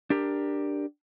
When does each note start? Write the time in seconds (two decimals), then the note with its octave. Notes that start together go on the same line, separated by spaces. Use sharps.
0.10 D4 G4 A#4